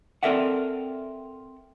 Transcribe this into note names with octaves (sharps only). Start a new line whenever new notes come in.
C4 A4 A#4 D5 E5 F#5